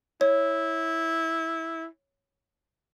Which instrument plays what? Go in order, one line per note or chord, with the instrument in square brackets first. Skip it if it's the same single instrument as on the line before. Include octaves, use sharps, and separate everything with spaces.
[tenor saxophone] E4 [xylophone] C#5